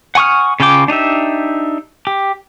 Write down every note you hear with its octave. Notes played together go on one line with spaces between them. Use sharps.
F#5 G#5 C#6 D#6 F6
C#3 C#4 F4 G5 D6
D4 D#4 G4 E5
G4